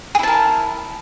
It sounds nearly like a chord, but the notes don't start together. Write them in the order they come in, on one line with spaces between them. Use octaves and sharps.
G#4 E4 A5 A#4